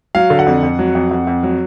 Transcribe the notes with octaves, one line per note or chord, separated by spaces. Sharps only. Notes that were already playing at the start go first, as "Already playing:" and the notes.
F#3 F5
D3
F#5
F2
F2
F#3
F2
F2
F2
F#3